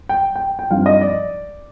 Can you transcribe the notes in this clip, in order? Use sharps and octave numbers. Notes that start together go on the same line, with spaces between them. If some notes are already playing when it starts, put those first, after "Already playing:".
G5
G5
G5
G2 F3 C4 D#4 F5
D#5
D5